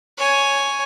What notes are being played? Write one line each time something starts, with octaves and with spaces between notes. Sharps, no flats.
C#5 G#5